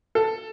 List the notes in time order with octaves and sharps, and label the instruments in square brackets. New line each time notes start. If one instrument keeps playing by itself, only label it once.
[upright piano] A4